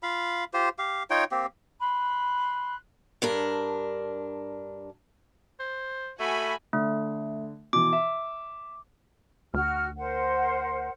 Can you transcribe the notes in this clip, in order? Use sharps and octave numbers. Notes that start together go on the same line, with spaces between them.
F4 F5 B5
F4 G4 C5
G4 F5
D#4 F4 C#5 G5
A#3 C4 G4
B5 C6 F#6
G2 D4 A#4
C5
A3 F#4 G#5 B5
D3 A3
B2 E3 D6
E5
D2 F#4 F6
A#4 C5 F#5